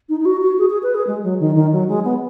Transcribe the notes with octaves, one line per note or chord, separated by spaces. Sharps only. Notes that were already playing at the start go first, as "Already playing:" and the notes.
D#4
D#4
F#4
F#4
G#4
G#4
B4
G#4
G#3
F#3
D#3
D#3
F#3
G#3
B3